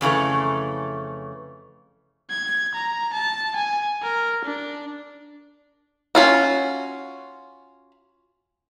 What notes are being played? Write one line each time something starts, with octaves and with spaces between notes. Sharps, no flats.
F2 C#3 E3 A3
G#6
A#5
A5
G#5
A#4
D4
C#4 F4 F#4